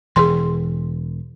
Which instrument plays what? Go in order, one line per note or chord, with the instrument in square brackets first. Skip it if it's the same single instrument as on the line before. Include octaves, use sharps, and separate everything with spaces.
[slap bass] E1 E3 [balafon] G#4 C6